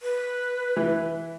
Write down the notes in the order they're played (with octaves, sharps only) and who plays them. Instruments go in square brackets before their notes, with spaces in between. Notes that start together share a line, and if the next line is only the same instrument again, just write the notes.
[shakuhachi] B4
[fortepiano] E3